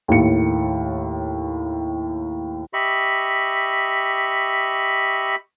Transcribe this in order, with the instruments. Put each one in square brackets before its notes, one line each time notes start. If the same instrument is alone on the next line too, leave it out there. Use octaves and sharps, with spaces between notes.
[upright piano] D#2 A2 C#7
[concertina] G4 D#5 E5 B5 C#6